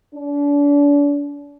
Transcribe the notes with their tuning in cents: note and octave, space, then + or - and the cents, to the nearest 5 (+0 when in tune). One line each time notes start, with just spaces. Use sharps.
D4 -35